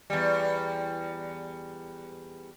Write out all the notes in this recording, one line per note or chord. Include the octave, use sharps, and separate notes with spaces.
E2 G3